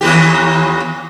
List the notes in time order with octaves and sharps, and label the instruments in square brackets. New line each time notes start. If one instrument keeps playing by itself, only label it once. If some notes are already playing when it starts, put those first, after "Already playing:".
[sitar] D#2 E3 G4